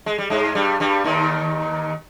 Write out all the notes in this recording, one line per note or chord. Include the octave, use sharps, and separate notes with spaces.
G#3
G3
G#2 G#3
G2 G3
G2 G3
D#2 D#3